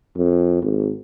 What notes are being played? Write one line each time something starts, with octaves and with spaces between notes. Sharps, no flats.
F2
G#1